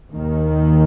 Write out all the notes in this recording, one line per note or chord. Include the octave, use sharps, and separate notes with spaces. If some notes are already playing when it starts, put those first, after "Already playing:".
D#2 D#3